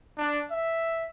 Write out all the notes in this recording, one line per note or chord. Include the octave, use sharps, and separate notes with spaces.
D4
E5